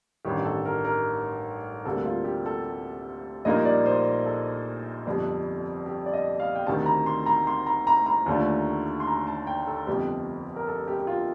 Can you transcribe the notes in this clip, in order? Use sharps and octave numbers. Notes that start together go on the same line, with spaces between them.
A1 G2 D#3 G4
A4
A#4
A#4
D2 C3 G3 A#3 A4
F4
G4
A4
A#1 A#2 G3 A#3 D#4 D#5
D5
C5
A4
G1 F2 C3 G3
G4
D5
D#5
F5
G5
D2 C3 D#3 A5
A#5
C6
A#5
C6
A#5
A#5
A#5
D#2 D3 A3 D4 F4
C6
A#5
A5
G5
A4
G1 F2 C3 G4
A#4
A4
G4
G4
F4